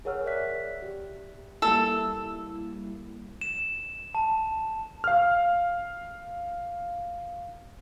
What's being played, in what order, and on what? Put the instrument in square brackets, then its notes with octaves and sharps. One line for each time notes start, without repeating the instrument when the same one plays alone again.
[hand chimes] G#4 A#4 C#5 F#5 E6 F6
D5 E5 F#6 B6
G4
[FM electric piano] G3 A#3 E4 [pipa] A4 [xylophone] E6
[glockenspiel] E7
A5
[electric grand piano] F5 F6